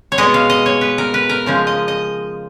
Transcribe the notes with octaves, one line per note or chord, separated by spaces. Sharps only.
C#5
B2 G#3 D#5
F5
D#5
C#5
B4
A#4
B4
A#4
C#3 F3 G#3
D#5
D#5